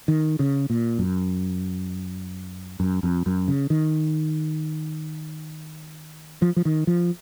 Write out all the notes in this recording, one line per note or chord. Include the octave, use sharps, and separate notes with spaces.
D#3
C#3
A#2
F#2
F#2
F2
F#2
C#3
D#3
F3
F3
D#3
F3